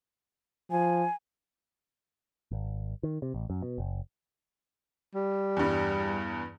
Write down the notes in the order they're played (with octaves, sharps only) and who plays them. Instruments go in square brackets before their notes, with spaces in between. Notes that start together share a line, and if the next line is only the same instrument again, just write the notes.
[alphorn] F3 [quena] G#5
[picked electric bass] G#1
D#3
C3
A1
F#2
B2
F#1
[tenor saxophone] G3
[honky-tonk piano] E2 G2